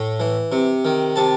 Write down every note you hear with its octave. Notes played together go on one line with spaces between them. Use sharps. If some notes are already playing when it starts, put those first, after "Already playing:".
Already playing: A2
E3
C3
D#3
C3 A5